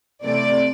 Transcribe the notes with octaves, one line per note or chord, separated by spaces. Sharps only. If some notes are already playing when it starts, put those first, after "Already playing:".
C3 E3 A3 C4 D5